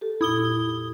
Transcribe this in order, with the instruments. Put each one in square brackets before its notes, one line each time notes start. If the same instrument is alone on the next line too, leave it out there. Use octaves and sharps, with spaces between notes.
[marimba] G4 A4
[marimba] F2 A#2 [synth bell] E4 D#6 G7